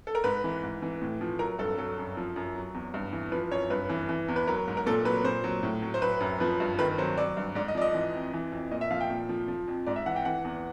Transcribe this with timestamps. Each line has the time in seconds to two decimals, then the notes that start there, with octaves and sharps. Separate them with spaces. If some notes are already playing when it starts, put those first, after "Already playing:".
0.07 A4
0.15 A#4
0.24 G#2 B4
0.44 E3
0.63 G#2
0.82 E3
1.02 A2
1.21 F3
1.39 F#3 A#4
1.59 G2 A4
1.78 F#3 A4
1.98 F#2
2.17 F3
2.36 F#2
2.55 F#3
2.74 E2
2.94 G2
3.13 E3
3.32 F3 B4
3.51 F#2 C#5
3.70 G2 B4
3.89 E3
4.09 E3
4.28 E2
4.36 B4
4.47 F#3 A#4
4.68 G#2
4.77 A#4
4.86 A#2 A4
5.05 F#3 B4
5.24 A#2 C5
5.44 F#3
5.63 A2
5.82 F#3
5.94 C5
6.02 F#3 B4
6.21 F#2
6.40 F3 B4
6.60 G2
6.79 D#3 B4
6.98 F#3 C5
7.17 F#3 D5
7.37 G2
7.55 G#2 D5
7.68 D#5
7.75 F3 D5
7.81 D#5
7.94 E3
8.14 F2
8.33 E3
8.52 F2
8.71 A#2 D#5
8.81 E5
8.91 F3 F5
9.00 G5
9.10 A#2
9.29 F3
9.48 F3
9.68 F2
9.86 G#2 D5
9.96 E5
10.06 E3 F#5
10.16 G5
10.25 E3 F#5
10.45 E2